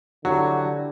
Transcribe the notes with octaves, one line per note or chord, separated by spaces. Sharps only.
D3 F#3 E4 F#4 G4 A4